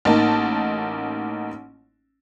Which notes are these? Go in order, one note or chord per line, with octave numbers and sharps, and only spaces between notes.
A1 A#3 D#4 A5